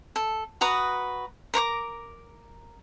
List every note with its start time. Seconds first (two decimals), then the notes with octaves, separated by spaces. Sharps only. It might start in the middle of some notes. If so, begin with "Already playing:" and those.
0.16 A4
0.61 F#4 B4 A#5 D#6
1.54 A#4 A#5 C#6 D6